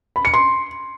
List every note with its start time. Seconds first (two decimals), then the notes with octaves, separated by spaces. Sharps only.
0.16 B5
0.25 C#7
0.34 C6